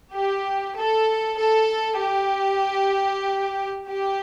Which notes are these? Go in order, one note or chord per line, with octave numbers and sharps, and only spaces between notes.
G4
A4
A4
G4
G4